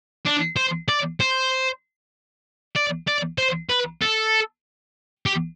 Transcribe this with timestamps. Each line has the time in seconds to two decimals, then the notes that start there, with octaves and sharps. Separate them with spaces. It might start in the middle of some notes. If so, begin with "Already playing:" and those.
0.26 D4
0.57 C5
0.88 D5
1.20 C5
2.76 D5
3.08 D5
3.38 C5
3.70 B4
4.02 A4
5.26 G4